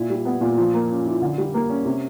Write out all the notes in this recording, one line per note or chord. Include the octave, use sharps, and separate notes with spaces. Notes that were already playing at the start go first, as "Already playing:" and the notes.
Already playing: A#2 E4
G3
B3
A#2
F3
A#3
C#4
E4
D3
G3
A#3
C#4
C3